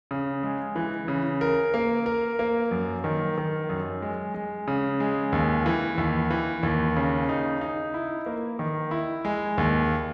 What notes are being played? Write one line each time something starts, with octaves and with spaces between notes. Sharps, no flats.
C#3
G#3
E3
C#3
A#4
A#3
A#4
A#3
F#2
D#3
D#3
F#2
G#3
G#3
C#3
G#3
D#2
E3
D#2
E3
D#2
C#3
D#4
D#4
E4
A#3
D#3
E4
G#3
D#2